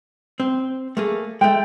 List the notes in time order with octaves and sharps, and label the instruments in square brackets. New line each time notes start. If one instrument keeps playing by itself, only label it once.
[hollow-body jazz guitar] C4
A3 A#3 G#4
[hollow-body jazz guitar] G#3 A3 [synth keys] G5